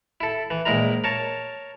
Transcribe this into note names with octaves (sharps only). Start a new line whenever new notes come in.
E4 A4
E3
A#1 G#3 E4 A#4 A#5
A#4 C#5 A5